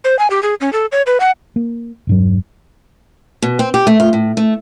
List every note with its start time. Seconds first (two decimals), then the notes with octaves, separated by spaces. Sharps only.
0.04 C5
0.19 G#5
0.30 G4
0.43 G#4
0.61 C#4
0.73 A4
0.92 C#5
1.06 B4
1.20 F#5
1.56 A#3
2.07 E1 G2 F#3
3.42 B2
3.59 C4
3.74 G4
3.87 A3
4.00 F4
4.13 A2
4.37 A3